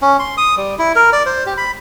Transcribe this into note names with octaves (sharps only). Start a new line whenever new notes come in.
C#4
C6
D#6
G3
E4
A#4
D5
C5
G4
B5